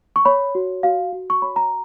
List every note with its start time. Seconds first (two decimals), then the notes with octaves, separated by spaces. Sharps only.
0.16 C#6
0.25 C#5 B5
0.55 F#4
0.83 F#4 F5
1.13 F#4
1.30 C#6
1.42 C#5 B5
1.56 A#5